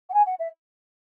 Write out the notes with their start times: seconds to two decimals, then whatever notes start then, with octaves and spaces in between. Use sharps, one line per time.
0.09 F#5
0.14 G#5
0.26 F#5
0.39 E5